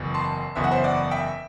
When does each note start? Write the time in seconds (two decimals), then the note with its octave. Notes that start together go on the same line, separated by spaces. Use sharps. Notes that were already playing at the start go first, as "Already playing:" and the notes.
Already playing: F#1 E2 B2
0.14 A5 C6
0.55 F#1 E2 B2 E5
0.64 F#5
0.71 C5 E5
0.84 D5 F#5
1.11 E5 G5